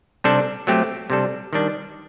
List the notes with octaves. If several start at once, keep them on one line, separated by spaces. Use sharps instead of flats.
C3 G3 D4 A4
F#3 A3 C4 G4
C3 G3 D4 A4
D#3 G3 D4